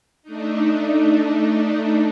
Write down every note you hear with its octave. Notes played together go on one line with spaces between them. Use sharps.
A3 D4 D#4